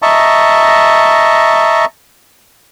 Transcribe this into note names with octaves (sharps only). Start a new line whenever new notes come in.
D#5 E5 A5 A#5 C#6